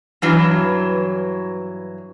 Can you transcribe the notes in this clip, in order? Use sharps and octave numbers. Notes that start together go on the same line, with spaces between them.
G2 E3 F#3